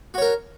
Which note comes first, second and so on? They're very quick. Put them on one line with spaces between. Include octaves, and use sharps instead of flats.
F#4 C#5 A#4